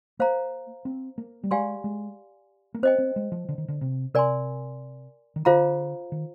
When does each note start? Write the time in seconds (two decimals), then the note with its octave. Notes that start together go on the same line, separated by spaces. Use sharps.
0.19 A#3 C5 F5 A#5
0.85 C4
1.18 A#3
1.44 G3
1.51 G#3 G4 D5 F5 G#5 C6
1.84 G#3
2.74 A#3
2.83 C4 C5 D#5 G5
2.98 C4
3.16 G#3
3.32 F3
3.49 D3
3.58 D#3
3.68 D3
3.81 C3
4.14 C3 A#4 D5 G#5 C6
5.36 D#3
5.45 D3 F4 G#4 C5 F5 A#5
6.12 D#3